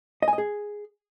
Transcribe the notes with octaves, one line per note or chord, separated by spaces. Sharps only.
D#5
G#5
D#5
G#4